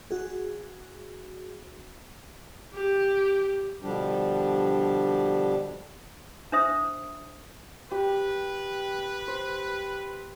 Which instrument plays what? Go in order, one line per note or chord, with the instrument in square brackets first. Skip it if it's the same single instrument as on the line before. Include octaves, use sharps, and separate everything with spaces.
[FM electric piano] F#4 G#4
[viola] G4
[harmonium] B2 D3 F3 G3 D4 G4
[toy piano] D4 C5 E5 D#6
[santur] G4 [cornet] B4
[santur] C5